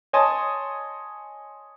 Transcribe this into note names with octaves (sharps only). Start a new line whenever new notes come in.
C#5 D#5 G#5 A5 C6 D#6